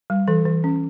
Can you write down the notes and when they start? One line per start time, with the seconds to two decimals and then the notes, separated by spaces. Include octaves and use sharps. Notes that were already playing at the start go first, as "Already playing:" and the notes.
0.10 G3
0.28 E3 A4
0.45 E3
0.64 C#4